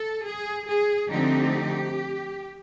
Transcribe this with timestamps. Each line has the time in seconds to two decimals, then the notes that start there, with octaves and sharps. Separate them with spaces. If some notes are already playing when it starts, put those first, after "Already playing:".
Already playing: A4
0.26 G#4
0.68 G#4
1.09 D3 F3 A3 C4 D#4 G4